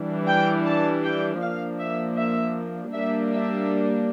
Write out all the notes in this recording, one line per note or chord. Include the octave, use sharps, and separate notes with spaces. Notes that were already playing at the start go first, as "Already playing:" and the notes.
Already playing: E3 G3 D4
G5
A5
G5
F3 A#3 D4 F5
E5
E5
G3 A#3 D4 E5
E5